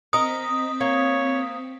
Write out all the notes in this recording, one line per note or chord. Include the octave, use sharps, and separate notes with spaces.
C4 A#4 D#5 D#6 B6
A#3 C#5